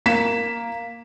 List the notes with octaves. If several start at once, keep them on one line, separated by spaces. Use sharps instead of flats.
A#3 B6 E7